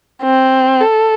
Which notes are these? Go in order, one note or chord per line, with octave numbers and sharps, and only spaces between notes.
C4
A4